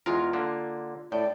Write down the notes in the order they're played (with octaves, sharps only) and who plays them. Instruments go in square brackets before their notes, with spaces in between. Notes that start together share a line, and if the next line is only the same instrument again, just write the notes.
[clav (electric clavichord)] E2 G#3 A#4 [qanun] F4
[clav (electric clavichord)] D3 A#3
[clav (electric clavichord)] A2 [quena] D5 [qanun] G5